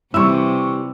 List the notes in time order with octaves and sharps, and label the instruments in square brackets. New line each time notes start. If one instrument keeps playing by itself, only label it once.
[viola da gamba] C3 E3 [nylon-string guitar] G3 E4 [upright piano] C#6 E6